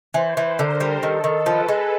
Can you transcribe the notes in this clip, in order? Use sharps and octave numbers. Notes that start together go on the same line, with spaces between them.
E3 C5
E3
D3 A#4
G3
D#3 A4
D#3
F3 B4
G#3